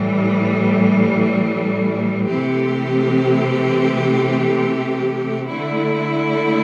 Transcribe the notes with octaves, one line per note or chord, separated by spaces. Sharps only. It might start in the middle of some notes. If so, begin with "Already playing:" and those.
Already playing: A2 E3 G3
C3 E3 A3 C4 G4
D3 A3 E4